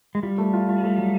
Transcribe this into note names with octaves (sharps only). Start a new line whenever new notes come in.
G#3
G3 F4
A3
F4
F4
A3
F#3